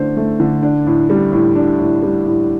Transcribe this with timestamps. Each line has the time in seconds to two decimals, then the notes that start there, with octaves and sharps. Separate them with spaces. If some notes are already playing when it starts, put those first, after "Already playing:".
Already playing: D3 A3 D4 C5
0.17 A3
0.40 D3
0.63 D4
0.87 A2
1.10 G3
1.33 A2
1.56 D4
1.79 A2
2.03 G3
2.26 A2